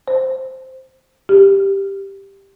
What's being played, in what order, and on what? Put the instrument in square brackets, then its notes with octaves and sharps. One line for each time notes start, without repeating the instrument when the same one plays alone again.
[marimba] C5
G4